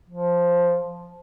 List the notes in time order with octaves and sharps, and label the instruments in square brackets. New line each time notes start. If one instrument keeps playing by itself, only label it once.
[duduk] F3